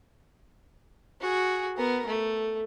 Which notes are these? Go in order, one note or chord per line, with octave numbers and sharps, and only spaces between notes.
F#4 G#4
B3 A#4
A3